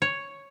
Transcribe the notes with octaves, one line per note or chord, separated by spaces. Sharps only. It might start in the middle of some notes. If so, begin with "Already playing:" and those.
C#5